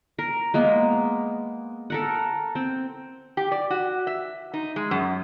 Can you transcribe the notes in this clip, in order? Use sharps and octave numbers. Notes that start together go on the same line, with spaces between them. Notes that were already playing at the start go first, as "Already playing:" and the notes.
A#4
G#3 A#3 B3
A4 A#4 F#5
C4
G4
D5
F#4
E5
D#4
G#3
F#2